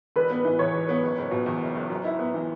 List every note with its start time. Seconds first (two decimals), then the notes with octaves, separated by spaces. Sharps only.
0.16 E1 B4
0.30 B3
0.45 E3
0.59 E2 C#5
0.74 E1
0.89 B3
1.03 F#1
1.18 F#1
1.31 B2
1.46 E2
1.61 F#1
1.75 F#1
1.90 F#2
2.04 E4
2.19 B3
2.34 E3